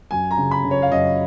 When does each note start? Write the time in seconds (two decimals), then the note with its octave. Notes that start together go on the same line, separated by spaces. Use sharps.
0.11 F#2 G#5
0.31 A#5
0.37 C#3
0.51 B5
0.64 C#3
0.71 C#5
0.82 F5
0.92 F#2 D#5